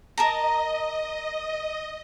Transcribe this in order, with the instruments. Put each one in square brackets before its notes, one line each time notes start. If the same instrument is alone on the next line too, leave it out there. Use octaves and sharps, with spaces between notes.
[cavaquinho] A#4 A5 A#5 [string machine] D#5